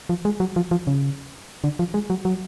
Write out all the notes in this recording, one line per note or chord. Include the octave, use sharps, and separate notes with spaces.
F3
G#3
F#3
F3
F3
C#3
D3
F3
G#3
F#3
F#3